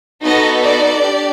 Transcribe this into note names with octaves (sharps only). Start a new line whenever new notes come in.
B3 D#4 F#4 A4 D#5
D5
D4 G4